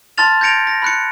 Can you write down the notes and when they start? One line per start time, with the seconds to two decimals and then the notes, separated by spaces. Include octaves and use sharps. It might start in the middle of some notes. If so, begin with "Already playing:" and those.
0.18 A5 C6 F6 A6 F7
0.41 G6 G#6 A#6 C#7 D7 F7
0.67 A#6
0.82 B5 F#6 C#7